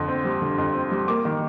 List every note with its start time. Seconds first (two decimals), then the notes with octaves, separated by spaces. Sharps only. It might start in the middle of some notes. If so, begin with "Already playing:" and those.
Already playing: F2 D3
0.08 C4
0.25 G3
0.41 D3
0.58 F2
0.75 C4
0.91 G3
1.08 A#3 D6
1.25 D#3